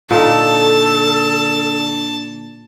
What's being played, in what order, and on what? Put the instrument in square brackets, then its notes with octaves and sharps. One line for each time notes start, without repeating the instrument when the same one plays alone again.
[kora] A#2 D#4 [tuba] D3 [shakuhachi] A4 [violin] A5